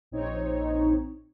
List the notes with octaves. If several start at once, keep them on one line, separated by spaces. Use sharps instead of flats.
A#1 C4 D#4 C#5